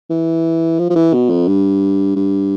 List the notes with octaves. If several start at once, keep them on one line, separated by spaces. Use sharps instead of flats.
E3
F3
F3
E3
B2
F2
G2
G2